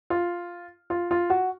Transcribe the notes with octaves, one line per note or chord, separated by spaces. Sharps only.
F4
F4
F4
F#4